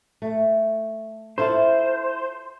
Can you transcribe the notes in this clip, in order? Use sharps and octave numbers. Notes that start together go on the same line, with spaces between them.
A3
E4 F4 A4 C5